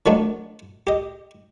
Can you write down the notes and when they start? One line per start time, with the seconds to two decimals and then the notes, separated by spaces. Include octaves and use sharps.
0.06 D#3 F3 F#3 A3 C#4 D4
0.87 G4 D#5